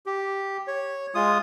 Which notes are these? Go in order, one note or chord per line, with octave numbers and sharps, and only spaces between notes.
G4
C#5
G#3 F4 D#6